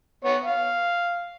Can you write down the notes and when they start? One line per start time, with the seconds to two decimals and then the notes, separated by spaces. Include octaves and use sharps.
0.24 B3 C#5
0.45 F5